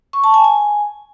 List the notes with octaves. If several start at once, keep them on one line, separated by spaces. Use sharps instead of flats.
C#6
A5
G#5
G#5